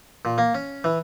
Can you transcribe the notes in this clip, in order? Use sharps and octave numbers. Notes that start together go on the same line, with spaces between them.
A#2
A#3
C#4
E3